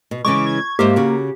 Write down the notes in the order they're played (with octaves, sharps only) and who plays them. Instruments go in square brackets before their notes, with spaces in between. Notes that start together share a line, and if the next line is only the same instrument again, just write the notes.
[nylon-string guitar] B2
[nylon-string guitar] C#3 E3 G#3 [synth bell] C#6 [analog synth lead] D6
[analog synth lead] G#6
[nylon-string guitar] G#2 C5 E5 [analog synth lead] A#3 [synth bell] G4
[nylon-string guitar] C#3 F#4